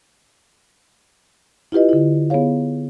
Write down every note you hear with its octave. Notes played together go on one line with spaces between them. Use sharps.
E4 F4 G4 B4 D#5
D3 E4
B3 E4 G#4 C#5 F5